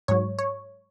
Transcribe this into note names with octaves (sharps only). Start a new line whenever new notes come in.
G#2 F#3 C#5
C#5